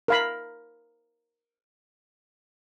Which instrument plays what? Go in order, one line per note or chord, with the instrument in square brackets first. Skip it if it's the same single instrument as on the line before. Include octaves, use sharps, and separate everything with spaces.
[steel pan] A#4 F5 B5